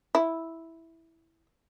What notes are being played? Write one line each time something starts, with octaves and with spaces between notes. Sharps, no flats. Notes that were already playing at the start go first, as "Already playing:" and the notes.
E4